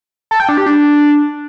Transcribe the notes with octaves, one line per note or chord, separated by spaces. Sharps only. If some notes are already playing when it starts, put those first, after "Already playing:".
A4
G5
D4
G4
D4